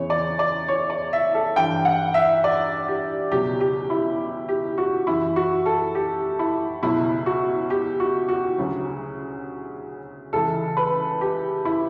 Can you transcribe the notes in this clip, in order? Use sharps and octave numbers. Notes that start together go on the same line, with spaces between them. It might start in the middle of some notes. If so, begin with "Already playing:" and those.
Already playing: E2 C#3 E3 C#5
D5
D5
C#5
D5
E5
A4
G2 E3 G5
F#5
E5
D5
G4
C#2 B2 F#3 G4
G4
E4
G4
F#4
F#2 E3 E4
F#4
A4
G4
E4
C#2 B2 F#3 E4
F#4
G4
F#4
F#4
D2 C#3 F#3
C#2 C#3 E3 A4
B4
G4
E4